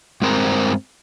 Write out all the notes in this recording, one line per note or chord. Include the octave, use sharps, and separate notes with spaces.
G2 G#3 C4 A#4 C5